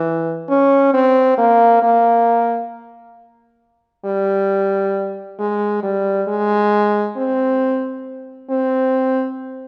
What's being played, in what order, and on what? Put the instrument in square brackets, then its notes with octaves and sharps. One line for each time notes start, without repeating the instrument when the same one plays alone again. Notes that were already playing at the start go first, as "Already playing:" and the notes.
Already playing: [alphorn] E3
C#4
C4
A#3
A#3
G3
G#3
G3
G#3
C4
C4